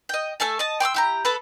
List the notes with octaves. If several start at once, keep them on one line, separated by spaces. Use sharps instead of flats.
D#5 G5
A3 A4 G#5 A5
D#5 A5
G5 C6 D6 E6
E4 G4 A#5
B3 A4 A5 B5